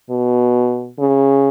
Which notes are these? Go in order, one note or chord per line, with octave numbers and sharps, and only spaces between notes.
B2
C#3